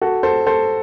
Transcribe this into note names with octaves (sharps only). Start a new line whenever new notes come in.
F#4 A4
A4 C5
A4 C5